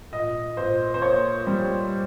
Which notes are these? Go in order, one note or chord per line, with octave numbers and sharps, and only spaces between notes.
A#2 D#5
A#2 C5
C5
A#3 C#5
G3